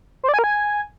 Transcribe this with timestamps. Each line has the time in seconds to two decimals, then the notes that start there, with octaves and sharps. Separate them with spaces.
0.24 C5
0.29 D5
0.34 G#5
0.39 A#4
0.44 G#5